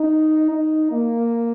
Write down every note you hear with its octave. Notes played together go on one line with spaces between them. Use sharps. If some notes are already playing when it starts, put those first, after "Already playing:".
Already playing: D#4
D#4
A#3